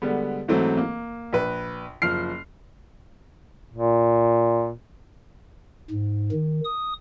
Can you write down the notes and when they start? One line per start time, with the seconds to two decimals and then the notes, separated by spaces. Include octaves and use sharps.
0.02 D3 G3 G#3 B3
0.48 G#2 E3 F#3 A3 C4
0.77 A#3
1.33 A#1 B4
2.02 F#1 F3 F6 C7
3.74 A#2
5.90 G#2
6.32 D#3
6.65 D#6